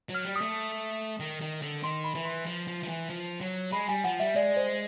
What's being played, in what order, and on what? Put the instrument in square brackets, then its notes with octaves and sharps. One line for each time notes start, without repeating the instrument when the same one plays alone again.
[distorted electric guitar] F#3
[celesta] F6
[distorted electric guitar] G3
[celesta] D#6
[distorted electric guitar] A3
D#3
D#3
D3
[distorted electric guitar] D#3 [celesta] C6
[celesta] B5
[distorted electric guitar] E3
[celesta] C6
[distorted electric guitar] F3
F3
F3
E3
F3
F#3
[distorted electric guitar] G#3 [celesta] B5
[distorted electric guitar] G3 [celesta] G#5
[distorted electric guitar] F3 [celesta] F#5
[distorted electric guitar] G3 [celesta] E5
[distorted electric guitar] G#3 [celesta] D5
[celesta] C5